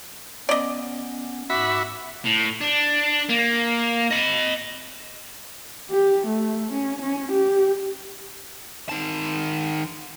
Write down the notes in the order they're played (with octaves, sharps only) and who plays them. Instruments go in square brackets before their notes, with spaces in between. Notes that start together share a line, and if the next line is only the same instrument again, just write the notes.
[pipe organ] B3 C#4 [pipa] D5 D#5
[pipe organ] G#2 D6 [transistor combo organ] F#4 E5 B5
[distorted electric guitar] A2
D4
A#3
D#5 B5
[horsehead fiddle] G4
A3
C#4
C#4
G4
[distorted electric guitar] D#3 A5